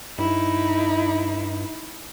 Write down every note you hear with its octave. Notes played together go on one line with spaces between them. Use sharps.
G2 D#4 E4